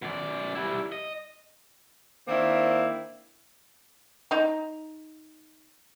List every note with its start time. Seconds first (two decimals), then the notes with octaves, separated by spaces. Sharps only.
0.02 F#2 D5
0.55 G3 E4
0.92 D#5
2.28 D#3 A#3 C4 D4 E4
4.31 D#4 A#5